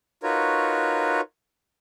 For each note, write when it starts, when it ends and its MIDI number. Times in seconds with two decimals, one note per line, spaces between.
0.23 1.21 63
0.23 1.21 65
0.23 1.21 66
0.23 1.21 70
0.23 1.21 71
0.23 1.21 73